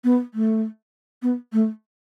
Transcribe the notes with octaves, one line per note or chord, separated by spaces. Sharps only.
B3
A3
B3
A3